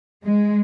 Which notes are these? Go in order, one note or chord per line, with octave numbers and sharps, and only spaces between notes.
G#3